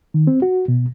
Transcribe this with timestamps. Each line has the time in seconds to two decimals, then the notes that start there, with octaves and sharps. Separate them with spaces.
0.14 D#3
0.27 C4
0.42 F#4
0.68 B2